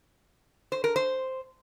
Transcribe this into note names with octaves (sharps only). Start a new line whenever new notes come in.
C5
A#4
C5